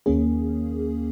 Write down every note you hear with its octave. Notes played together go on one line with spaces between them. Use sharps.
D#2 D#3 A#3 C#4 G#4